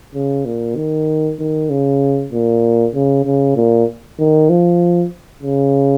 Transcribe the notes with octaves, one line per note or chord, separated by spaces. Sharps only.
C#3
A#2
D#3
D#3
C#3
A#2
C#3
C#3
A#2
D#3
F3
C#3